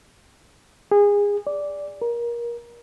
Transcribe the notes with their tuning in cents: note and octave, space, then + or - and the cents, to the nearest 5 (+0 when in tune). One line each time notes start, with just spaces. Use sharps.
G#4 -25
D5 -10
A#4 +25